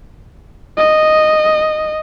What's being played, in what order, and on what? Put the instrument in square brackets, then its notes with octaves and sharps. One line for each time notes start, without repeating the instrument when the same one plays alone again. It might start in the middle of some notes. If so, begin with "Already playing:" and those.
[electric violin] D#5